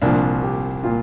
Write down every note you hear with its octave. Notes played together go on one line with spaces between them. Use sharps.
C2 A#2 F3 D4
G4
A#2 F4